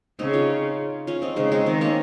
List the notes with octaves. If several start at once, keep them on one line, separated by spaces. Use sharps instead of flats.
C#3 C4 D#4
C#4 F4
C#4 F4
C4 D#4
C#3 G#3 C4
G#3 C4
D#3 G#3 C4
A#3 C#4